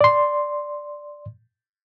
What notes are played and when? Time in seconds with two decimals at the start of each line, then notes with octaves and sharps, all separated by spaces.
0.01 D5 C6